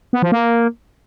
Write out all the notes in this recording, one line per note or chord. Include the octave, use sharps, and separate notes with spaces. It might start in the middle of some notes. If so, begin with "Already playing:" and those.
B3
F3
A#3